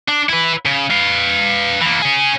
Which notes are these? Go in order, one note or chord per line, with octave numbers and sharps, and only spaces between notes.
D4
E4 B4
C#3
B4 F5
E3 A#3
C#4 G#4